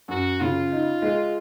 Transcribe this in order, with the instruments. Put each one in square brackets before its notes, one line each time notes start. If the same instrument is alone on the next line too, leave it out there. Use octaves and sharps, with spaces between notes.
[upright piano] F#2 [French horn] F#4
[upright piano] C#3 [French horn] F4
[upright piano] D#4
G#3